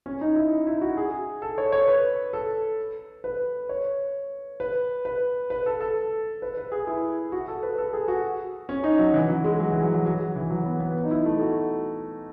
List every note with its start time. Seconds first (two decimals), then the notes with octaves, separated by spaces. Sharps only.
0.06 C#4
0.21 D#4
0.36 E4
0.67 E4
0.81 F#4
0.97 G#4
1.42 A4
1.58 C#5
1.72 C#5
1.88 B4
2.33 A4
3.24 B4
3.69 C#5
4.60 B4
5.05 B4
5.50 B4
5.66 A4
5.80 A4
6.42 B4
6.57 B4
6.72 G#4
6.87 E4
7.32 F#4
7.48 A4
7.63 B4
7.78 A4
7.93 G#4
8.08 F#4
8.69 C#4
8.84 D#4
8.99 F#3
9.14 E3
9.29 F#3
9.44 G#3
9.60 F#3
9.70 E3
9.82 F#3
9.94 F#3
10.05 F#3
10.36 E3
10.50 F#3
10.65 B3
10.80 B3
11.04 D#4
11.11 E4
11.26 A3
11.41 F#4